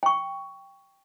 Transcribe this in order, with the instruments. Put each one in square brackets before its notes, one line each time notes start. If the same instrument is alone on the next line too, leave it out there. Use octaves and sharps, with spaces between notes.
[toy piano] G5 C#6